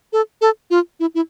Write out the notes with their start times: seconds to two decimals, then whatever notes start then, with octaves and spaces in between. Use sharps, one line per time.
0.13 A4
0.41 A4
0.70 F4
1.00 E4
1.15 E4